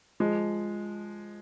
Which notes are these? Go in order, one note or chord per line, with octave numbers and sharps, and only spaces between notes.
F3 G#3